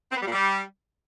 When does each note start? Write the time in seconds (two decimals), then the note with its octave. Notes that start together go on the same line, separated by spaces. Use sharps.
0.10 C4
0.16 B3
0.21 G3
0.26 A#2
0.32 G3